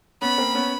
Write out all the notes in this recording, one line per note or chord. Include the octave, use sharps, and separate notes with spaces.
B3 C#4 B5
A#3 C4
B3 C#4